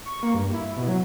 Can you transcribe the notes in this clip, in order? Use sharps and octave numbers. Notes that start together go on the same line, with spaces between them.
C#6
A#3
G2
E4
B2
F#3